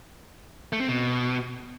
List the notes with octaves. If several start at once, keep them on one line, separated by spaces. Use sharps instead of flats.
A3
C4
B2